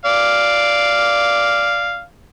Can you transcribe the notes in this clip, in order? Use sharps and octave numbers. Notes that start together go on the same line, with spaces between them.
D5 F5